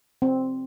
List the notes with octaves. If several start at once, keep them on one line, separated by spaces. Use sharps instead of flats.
C4